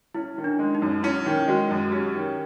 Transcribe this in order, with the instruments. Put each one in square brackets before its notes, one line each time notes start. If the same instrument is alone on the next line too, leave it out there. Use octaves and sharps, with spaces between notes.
[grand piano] C#4 [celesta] E4
[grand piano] D#3
[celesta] D4
[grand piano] G#3
[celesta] D#4
[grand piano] F#2
[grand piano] C#4 [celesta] E4
[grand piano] D#3
[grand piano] G#3 [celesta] F#4
[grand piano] F#2
[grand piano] C#4 [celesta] G4
[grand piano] D#3